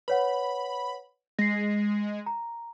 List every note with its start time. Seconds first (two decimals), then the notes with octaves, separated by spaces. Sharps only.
0.08 B4 C#5 F#5 B5
1.39 G#3 A#6 C7
2.26 A#5